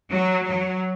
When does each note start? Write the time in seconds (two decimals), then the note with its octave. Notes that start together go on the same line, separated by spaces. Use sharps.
0.11 F#3
0.46 F#3